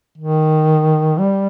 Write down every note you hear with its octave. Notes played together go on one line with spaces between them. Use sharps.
D#3
G3